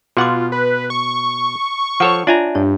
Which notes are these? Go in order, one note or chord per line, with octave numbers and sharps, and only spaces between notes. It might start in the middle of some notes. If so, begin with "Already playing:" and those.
B2 F4 G#4 F#5 C6 D6
B4
C#6
F3 A4 C#5 F#5 D6
D4 F4 C#5 E5 G#5 A#5
G2 C#5